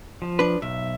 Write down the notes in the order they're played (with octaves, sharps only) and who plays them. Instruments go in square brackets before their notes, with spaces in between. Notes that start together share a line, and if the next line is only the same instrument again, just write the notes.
[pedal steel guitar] F3
[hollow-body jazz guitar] D4 B4
[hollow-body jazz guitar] B1 [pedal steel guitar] E5